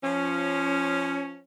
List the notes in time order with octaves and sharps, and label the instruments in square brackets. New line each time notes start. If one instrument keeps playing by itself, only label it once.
[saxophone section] F3 C#4